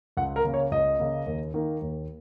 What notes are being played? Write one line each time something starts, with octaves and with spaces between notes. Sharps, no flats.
C#2 F#5
A#4
C#3 A#3
C#5
C#2 D#5
C#3 A#3
D#2
D#3 A#3
D#2